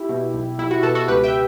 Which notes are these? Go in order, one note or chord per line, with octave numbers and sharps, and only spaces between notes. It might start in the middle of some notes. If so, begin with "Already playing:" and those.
Already playing: E4 G4
B2
B1
B1 E4
F#4
B2 F#4 A4
F#4 A4
C#2 G4 B4
E5 G5